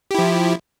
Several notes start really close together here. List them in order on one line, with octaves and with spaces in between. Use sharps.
G4 E4 F3